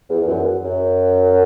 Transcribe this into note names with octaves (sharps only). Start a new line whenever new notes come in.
E2
E2
F#2
F#2